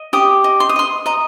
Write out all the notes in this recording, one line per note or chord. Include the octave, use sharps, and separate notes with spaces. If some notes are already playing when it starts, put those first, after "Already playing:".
Already playing: D#5
G4 D#6
D#5
C6
D#6
D#5 C6
D#5 A#5